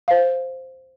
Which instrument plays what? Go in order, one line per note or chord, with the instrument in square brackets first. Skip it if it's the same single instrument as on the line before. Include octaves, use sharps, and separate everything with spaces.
[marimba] C5 F5